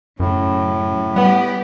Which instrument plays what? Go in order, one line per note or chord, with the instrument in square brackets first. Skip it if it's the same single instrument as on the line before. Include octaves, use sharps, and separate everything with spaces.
[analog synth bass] F#2 [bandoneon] A2 [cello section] C#3 F#3
[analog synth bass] G3 [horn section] B3 [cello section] G4 B4